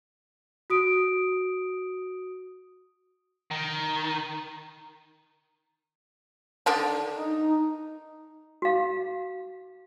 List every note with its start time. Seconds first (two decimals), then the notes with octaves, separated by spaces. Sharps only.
0.70 F#4 D#6 D7
3.51 D#3
6.66 D3 D#3 D4
7.13 D#4
8.62 F#4 F5